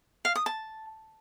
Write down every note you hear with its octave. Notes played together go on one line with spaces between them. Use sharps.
F5
D#6
A5